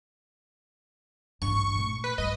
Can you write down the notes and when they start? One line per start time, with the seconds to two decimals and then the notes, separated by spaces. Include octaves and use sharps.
1.42 A1 G2 C#6
1.75 A#2 A3
2.04 B4
2.18 G2 D#5